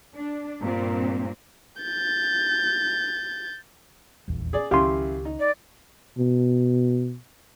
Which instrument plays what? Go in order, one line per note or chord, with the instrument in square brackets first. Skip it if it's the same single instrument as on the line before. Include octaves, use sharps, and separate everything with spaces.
[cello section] D4
G2 A#2 C4
[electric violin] G6 A6
[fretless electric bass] D#1 A#1 E2
[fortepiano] G#4 D5
[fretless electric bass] C#2 D#3 [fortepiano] F#2 E4 F5 [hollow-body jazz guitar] G4 C6
[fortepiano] D#4
[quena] D5
[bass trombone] B2